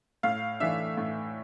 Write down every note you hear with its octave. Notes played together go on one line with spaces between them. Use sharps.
A2 F5
E3 A3 D4 E5
A2